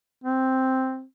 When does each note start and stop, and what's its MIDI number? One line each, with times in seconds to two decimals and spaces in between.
0.24 1.04 60